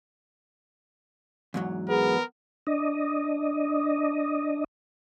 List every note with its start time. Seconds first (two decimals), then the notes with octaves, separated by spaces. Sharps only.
1.54 E2 G#2 F#3
1.89 B3 G#4 A#4
2.67 D4 D#5